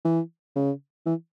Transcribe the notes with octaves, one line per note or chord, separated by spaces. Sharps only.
E3
C#3
E3